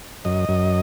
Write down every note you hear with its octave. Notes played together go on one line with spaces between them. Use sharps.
F#2 D#5
F#2